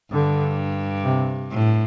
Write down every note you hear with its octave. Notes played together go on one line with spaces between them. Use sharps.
G2 D3
C3
A2